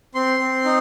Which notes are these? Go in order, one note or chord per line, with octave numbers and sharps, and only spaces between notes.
C4 C6
C4
D#4